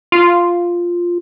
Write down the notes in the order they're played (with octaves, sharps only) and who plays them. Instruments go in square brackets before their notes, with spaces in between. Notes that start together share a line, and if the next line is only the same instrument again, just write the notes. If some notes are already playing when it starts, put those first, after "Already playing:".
[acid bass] F4